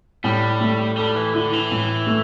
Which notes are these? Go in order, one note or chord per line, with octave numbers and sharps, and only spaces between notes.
A2 G3
A3
G3 A4
E3
D3 E4
E3
A2
A3